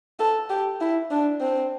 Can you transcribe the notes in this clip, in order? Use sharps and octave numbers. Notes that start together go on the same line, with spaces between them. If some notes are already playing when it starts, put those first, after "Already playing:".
A4
G4
E4
D4
C4